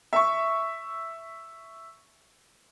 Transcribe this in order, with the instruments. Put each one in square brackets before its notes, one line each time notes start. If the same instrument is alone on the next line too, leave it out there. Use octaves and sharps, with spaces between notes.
[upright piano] E5 C#6